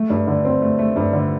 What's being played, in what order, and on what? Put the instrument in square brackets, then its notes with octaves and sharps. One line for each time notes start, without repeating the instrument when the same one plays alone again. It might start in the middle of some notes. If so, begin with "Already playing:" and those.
Already playing: [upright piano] A3
G2
D3
C4
A3
A3
G2
D3